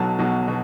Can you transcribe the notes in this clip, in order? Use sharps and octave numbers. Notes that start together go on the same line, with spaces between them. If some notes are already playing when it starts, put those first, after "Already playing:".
Already playing: B1 B2 F#3 A5
B1 B2 F#3
B2